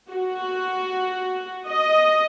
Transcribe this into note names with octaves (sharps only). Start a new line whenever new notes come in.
F#4
D#5